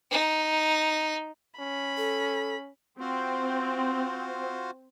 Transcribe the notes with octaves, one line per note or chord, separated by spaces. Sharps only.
D#4
C#4 B5
A4
C4 F4 F#4 C5